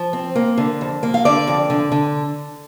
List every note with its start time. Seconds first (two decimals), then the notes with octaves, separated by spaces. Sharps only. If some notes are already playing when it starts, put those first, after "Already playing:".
Already playing: F3
0.13 C4
0.36 A#3
0.58 D3
0.81 F2
1.03 A#3
1.14 F5
1.25 D3 D5
1.47 F2
1.70 D3
1.92 D3